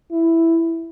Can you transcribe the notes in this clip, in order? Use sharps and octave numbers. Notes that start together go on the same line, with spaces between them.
E4